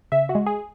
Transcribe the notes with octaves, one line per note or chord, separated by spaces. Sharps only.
C#3 E5
F#4
G#3
G#4